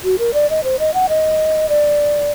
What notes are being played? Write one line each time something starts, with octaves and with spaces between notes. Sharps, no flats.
F#4
A#4
D5
D#5
C5
D#5
F#5
D#5
D5